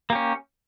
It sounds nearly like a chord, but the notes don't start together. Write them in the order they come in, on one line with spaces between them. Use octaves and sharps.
A#3 G4 C#4